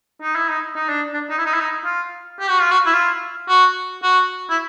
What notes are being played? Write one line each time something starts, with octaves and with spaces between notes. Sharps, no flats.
D#4
E4
D#4
D#4
D4
D4
D#4
E4
D#4
E4
D#4
F4
G4
F#4
F4
F#4
E4
F4
F#4
F#4
E4